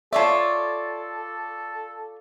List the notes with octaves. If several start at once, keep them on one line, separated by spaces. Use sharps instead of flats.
F4 A4 C#5 D5 E5 A5